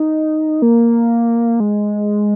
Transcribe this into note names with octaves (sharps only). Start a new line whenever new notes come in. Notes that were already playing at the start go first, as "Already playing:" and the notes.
Already playing: D#4
A#3
G#3